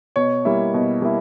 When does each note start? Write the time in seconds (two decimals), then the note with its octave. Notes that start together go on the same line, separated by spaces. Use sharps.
0.16 B2 C#5
0.45 G3 A#3 E4
0.74 B2
1.02 G3 A#3 E4